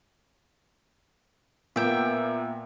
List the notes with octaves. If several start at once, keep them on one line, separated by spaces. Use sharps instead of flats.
A#2 A#3 B3 E5 G5